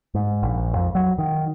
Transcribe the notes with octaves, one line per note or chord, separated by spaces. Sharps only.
G#2
A#1
F2
F#3
D#3